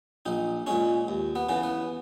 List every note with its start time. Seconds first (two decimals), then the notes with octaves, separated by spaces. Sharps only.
0.26 A#1 D#4
0.67 A#2 G#3 C#4
1.08 D#2
1.36 B3
1.49 C#3 E3 B3
1.63 B3